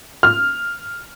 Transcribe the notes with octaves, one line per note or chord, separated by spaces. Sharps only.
F6